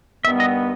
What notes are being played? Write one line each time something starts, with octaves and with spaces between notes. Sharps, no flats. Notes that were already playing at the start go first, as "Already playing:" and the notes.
G2 D#3 G3 B3 E5
D#5